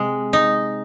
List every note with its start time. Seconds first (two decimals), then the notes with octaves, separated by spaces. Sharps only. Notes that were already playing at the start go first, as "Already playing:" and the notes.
Already playing: C3 G#3
0.33 D#4